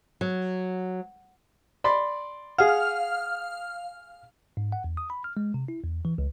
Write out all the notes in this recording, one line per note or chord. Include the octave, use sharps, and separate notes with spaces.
F#3
D5 B5 C6
G#4 F5 F#5 F6
G#2
F#5
E2
D#6
B5
F6
G#3
C3
E4
E2
E3
C#2